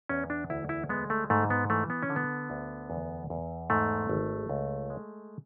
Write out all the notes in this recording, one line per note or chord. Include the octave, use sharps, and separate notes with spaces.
E2 C#4
D4
D2 E4
E4
G#3 B3
A3
G#2 A3
B3
E3 A3
B3
C#4
D3
B3
D2
E2
E2
G#2 A3
G#1
C#2
G#3